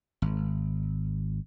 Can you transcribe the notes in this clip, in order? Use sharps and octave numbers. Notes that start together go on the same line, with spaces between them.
G#1